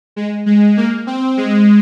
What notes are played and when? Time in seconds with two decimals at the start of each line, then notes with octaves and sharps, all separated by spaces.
0.16 G#3
0.46 G#3
0.77 A#3
1.07 C4
1.37 G#3